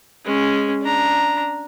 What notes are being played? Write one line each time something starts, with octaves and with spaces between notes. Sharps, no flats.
G#3 C#4
D4 A#5